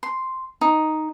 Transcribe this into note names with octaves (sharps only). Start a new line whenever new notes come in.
C6
D#4